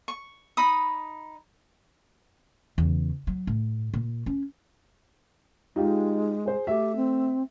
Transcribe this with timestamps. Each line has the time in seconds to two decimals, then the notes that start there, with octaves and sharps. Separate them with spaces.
0.08 C#6
0.57 D#4 B5 D#6
2.78 E2 C#3
3.27 F#3
3.47 A2
3.94 A#2
4.26 C#4
5.76 G#3 D#4 F4 G4
6.45 G#4 C5
6.67 A3 G4 E5
6.96 C4